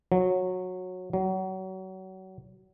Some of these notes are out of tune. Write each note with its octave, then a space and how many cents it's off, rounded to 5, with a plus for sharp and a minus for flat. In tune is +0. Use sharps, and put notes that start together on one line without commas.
F#3 -15
F#3 +30